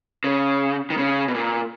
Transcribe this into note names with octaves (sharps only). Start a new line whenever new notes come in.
C#3
D#3
C#3
B2
A#2